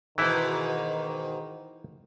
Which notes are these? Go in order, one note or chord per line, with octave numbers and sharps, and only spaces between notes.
G#2 B2 D#3 E3 E4